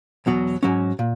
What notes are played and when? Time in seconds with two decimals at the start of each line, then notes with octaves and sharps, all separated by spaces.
0.26 E2 B2 F#3
0.63 G#2 F#3 C#4
0.99 A#2